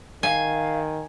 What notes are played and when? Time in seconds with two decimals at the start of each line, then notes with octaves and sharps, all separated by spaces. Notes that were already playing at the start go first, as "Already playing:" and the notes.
0.23 D#3 F5 G#5